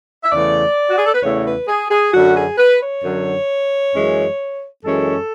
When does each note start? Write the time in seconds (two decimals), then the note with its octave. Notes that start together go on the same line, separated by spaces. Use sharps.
0.24 E5
0.32 E2 C#3 E3 A3 D5
0.90 F#4
0.97 G#4
1.06 A4
1.14 B4
1.22 E2 C#3 E3 A3 C#5
1.46 B4
1.68 G#4
1.91 G#4
2.13 F#2 D3 F#3 F#4
2.36 G#4
2.58 B4
2.81 C#5
3.04 F#2 D3 F#3
3.94 F#2 E3 G#3 C#4
4.84 F#2 E3 G#3 C#4 A4